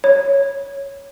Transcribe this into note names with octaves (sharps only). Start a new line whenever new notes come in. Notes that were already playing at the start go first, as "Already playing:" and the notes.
C#5